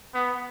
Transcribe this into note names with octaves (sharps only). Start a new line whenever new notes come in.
B3